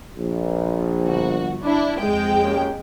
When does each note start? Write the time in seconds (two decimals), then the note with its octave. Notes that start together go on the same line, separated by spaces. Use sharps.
0.17 A#1
1.03 G1 F#4
1.64 D4 E4
2.01 F2 G#3 G5
2.43 A#3 C#4 G4